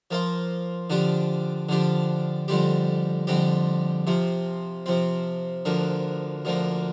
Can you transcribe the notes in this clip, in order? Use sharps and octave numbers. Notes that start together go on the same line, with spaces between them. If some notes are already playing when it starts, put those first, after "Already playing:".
F3 A#3 F4 C5 F5
D3 F3 D4 G4
D3 F3 D4 G4
F2 D3 G3 C4 G4
F2 D3 G3 C4 G4
C3 F3 C4
C3 F3 C4
D2 D3 F3 A#3
D2 D3 F3 A#3